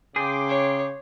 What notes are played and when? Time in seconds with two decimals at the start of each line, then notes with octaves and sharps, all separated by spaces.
0.16 C#3 G#4 G5 C6 D6
0.48 C#5